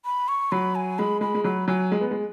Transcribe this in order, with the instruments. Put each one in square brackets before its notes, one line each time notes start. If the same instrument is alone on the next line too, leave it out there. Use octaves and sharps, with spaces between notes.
[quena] B5
C#6
[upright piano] F#3 [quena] B5
[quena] G#5
[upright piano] G#3 [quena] B5
[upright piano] G#3 [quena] B5
[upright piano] G#3
[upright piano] F#3 [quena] B5
[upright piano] F#3 [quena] G#5
[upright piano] G#3
B3
G#3